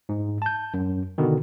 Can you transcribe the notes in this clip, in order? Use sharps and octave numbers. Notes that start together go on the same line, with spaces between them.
G#2
A5 G6
F#2
B2 D3 D#3